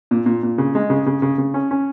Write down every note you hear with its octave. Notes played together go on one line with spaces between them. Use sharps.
A#2
A#2
A#2
C#3
G#3
C#3
C#3
C#3
C#3
C#4
C#4